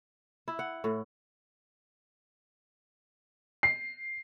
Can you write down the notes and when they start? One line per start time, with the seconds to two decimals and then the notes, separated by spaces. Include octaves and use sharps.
0.48 E4
0.59 F#5
0.84 A2
3.63 C7